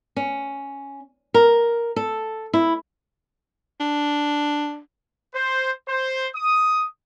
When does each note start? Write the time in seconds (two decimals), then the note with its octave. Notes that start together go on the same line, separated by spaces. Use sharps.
0.16 C#4
1.34 A#4
1.96 A4
2.54 E4
3.80 D4
5.34 C5
5.87 C5
6.35 D#6